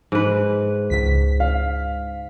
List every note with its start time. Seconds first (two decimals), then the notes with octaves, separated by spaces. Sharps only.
0.12 G#2 B4
0.90 C#2 B6
1.40 F5